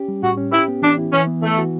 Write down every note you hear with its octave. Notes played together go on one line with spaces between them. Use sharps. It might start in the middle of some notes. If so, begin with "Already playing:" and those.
Already playing: C#4 G4
G3
A2 F#4
C#4
E4 G4
B3
E3 D4
E4
E3 C#4
B3
E3 A3
F#4